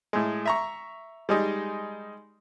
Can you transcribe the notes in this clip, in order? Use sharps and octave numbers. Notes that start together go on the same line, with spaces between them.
A2 G#3
E5 A#5 C#6
G3 G#3 D#4